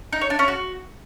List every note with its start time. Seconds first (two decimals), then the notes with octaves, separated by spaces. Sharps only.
0.13 D#4
0.21 C#5
0.30 D4
0.39 C#4
0.48 F#4